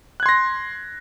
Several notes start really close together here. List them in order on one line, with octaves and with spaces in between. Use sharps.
F#6 G#6 C6 A#6